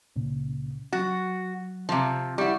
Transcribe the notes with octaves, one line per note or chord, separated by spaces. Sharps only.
C#2 A#2 C#3
F#3 F#4 F#6 A6
C3 F3
G3 E4 F#5 C#6